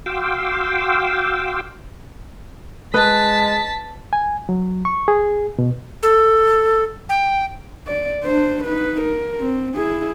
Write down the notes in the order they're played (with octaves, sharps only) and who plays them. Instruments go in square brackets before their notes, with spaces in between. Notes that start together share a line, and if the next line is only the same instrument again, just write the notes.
[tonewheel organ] F#4 F5 G5 C6 D6 E6
[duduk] G#3 [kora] B4 D#5 [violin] A5 B6
[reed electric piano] G#5
F#3
C#6
G#4
B2
[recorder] A4
G5
[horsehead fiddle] D5
D4 C5
D#4 B4
A#4
C4
E4 G#4